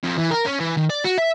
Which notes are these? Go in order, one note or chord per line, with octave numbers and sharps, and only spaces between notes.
F2
E3
A#4
C#4
E3
D#3
D5
F#4
E5